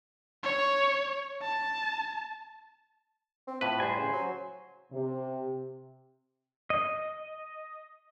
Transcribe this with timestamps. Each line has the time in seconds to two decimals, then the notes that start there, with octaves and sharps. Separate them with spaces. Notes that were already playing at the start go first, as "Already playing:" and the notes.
0.43 C#5
1.42 A5
3.47 C4
3.61 A2 F3 B4
3.80 G3 C5 G#5
3.97 C#3
4.13 F#3
4.92 C3
6.70 D#5